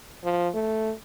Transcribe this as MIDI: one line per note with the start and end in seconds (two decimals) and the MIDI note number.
0.24 0.49 53
0.55 0.92 57